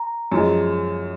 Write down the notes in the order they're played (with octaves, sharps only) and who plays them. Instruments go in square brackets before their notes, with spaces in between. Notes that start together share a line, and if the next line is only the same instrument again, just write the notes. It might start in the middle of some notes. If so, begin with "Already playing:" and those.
Already playing: [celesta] A#5
[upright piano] F#2 F3 G#3